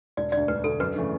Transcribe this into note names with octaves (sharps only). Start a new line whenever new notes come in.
E1 D5
D2 D3 D5
E1 B4
D2 D3 A4
F#2 B4
C#3 E3 A3 D4